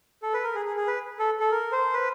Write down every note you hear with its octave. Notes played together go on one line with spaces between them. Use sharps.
A4
B4
A#4
G#4
G#4
G#4
B4
A4
A4
A#4
C5
B4